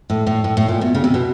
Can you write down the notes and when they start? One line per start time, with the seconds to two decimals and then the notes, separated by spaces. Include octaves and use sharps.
0.10 A2
0.27 A2
0.44 A2
0.57 A2
0.68 A#2
0.81 B2
0.95 C#3
1.04 C3
1.14 B2